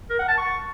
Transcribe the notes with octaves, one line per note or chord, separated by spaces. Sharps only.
A#4
F#5
A5
C#6